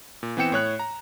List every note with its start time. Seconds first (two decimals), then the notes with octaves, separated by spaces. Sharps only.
0.23 A#2
0.37 E3 B3 C4 G5 C#7 E7
0.52 A2 C#5 F#6
0.79 A#5